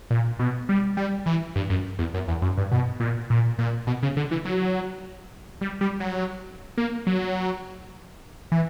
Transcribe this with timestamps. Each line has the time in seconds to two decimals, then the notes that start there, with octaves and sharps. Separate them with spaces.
0.11 A#2
0.39 B2
0.69 G3
0.97 G3
1.26 E3
1.56 G2
1.70 F#2
1.99 E2
2.14 F#2
2.28 E2
2.42 F#2
2.58 G2
2.72 B2
3.00 A#2
3.30 A#2
3.59 A#2
3.87 B2
4.03 C#3
4.17 D3
4.31 E3
4.45 F#3
5.61 G3
5.81 G3
6.00 F#3
6.78 A#3
7.07 F#3
8.52 E3